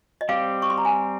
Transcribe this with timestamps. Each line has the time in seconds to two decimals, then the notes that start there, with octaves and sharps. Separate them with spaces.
0.21 D#5
0.29 G3 C4 G4 F5
0.62 C#6
0.70 C6
0.78 A#5
0.85 G#5